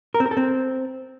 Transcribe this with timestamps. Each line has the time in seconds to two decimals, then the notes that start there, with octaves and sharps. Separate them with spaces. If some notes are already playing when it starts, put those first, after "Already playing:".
0.14 A#4
0.20 C4
0.26 A#4
0.31 A4
0.37 C4